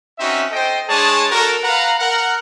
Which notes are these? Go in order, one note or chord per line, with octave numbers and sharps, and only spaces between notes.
C4 C#4 D#4 F#4 E5
A4 C5 D#5 G5
G#3 D4 G#4 C#5 A5
F#4 A4 A#4
B4 F5 F#5 A#5
A#4 F#5